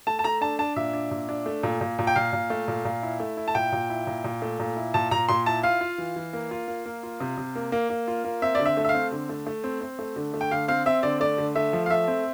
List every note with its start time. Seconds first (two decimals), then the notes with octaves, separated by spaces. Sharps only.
0.07 A3 A5
0.19 A5
0.24 A3 A#5
0.41 D4 A5
0.59 D4 A5
0.76 A#2 E5
0.93 D4
1.11 A#2
1.29 D4
1.46 A3
1.63 A#2
1.81 A#2
1.99 A#2
2.07 G5
2.16 A#2 F5
2.33 A#2
2.50 A3
2.68 A#2
2.85 A#2
3.03 E4
3.20 A3
3.37 E4
3.48 A5
3.55 A#2 G5
3.72 A#2
3.90 E4
4.07 A#2
4.24 A#2
4.42 A3
4.59 A#2
4.77 E4
4.94 A#2 A5
5.11 A#2 A#5
5.29 A#2 C6
5.46 E4 A5
5.63 F4 F5
5.81 F4
5.98 E3
6.16 E3
6.33 A#3
6.51 F4
6.68 A#3
6.86 A#3
7.03 F4
7.20 C3
7.38 C3
7.55 A#3
7.72 A#3
7.90 A#3
8.08 F4
8.24 A#3
8.42 C4 E5
8.55 D3 D5
8.65 E5
8.77 A3
8.85 E5
8.89 F5
8.94 C4
9.12 D3
9.29 A3
9.47 A3
9.64 C4
9.81 C4
9.99 A3
10.16 D3
10.34 A3
10.41 G5
10.51 D3 F5
10.68 C4 F5
10.86 C4 E5
11.03 D3 D5
11.20 A3 D5
11.38 D3
11.56 A3 E5
11.73 F3
11.86 F5
11.90 A3 E5
12.08 C4